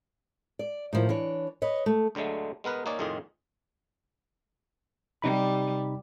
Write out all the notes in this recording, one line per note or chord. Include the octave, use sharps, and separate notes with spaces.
D5
A2 D#3 F3
E3 D4 C#5
B4 C#5 D#5
A3
D2 D3 F#3 G#3 A3
G#3 B3 A#4 B4
A#3 D#4 C#5 D5 G#5
F2 A2 D#3 F4 G#4
C3 G3 D#4 B5